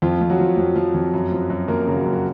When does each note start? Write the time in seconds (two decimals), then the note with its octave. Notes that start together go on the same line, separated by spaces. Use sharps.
0.02 F2 F3 F4
0.21 F2
0.30 F#3 F#4
0.39 F3
0.57 F2
0.76 F3
0.94 F2
1.14 F#2
1.32 F3
1.50 F#2
1.68 F#2 A#3 A#4
1.87 C#3
1.96 F#3 F#4
2.05 F#2
2.13 F#4